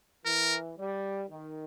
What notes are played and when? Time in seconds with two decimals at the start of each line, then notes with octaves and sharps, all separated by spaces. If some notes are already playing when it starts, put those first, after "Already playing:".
0.25 E3 A#4
0.77 G3
1.30 D#3